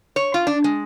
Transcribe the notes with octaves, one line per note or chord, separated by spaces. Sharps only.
C#5
F4
D4
G#3